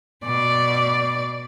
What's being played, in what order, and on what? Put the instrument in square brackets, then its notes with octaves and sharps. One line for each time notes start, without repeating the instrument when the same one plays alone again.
[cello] B2 D5